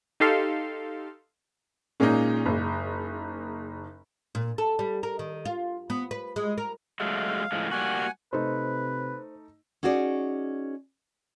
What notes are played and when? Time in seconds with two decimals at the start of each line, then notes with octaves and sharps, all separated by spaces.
0.20 D#4 G4 A4 F5 C6
2.00 A#2 G#3 A#3 C#4 D#4
2.46 F#1
4.35 A#2
4.58 A4
4.79 G3
5.03 A#4
5.19 D#3
5.45 F4
5.90 B3
6.11 B4
6.36 G#3
6.58 A#4
7.00 F#3 G#3 A3 F5
7.52 A2 F3 G#3
7.72 G3 A#3 F#4 F#5 G#5
8.33 C3 A3 D#4 B4 C5
9.83 C#4 D#4 F#4 G#4 D5